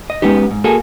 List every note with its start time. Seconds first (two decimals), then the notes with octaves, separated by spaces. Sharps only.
0.10 D#5
0.22 G#3 B3 C#4 D#4 G4
0.51 G#2
0.64 A#3 F#4 G#4 A4